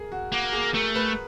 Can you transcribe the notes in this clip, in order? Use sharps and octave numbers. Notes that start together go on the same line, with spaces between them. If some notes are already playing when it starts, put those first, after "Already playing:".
Already playing: G#4 A#4
F#4
A#3 F#4
G#4
A3 A#4
B4